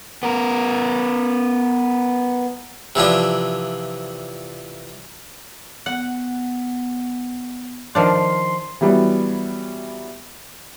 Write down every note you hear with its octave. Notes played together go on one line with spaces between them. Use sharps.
B3 A#4
C3 E3 F3 D4
B3 F#5
D#3 F3 D4 C6
E3 F#3 G3 B3